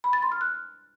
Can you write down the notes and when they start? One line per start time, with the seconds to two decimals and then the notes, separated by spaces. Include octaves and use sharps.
0.04 B5
0.13 A6
0.22 C6
0.32 F6
0.41 F#6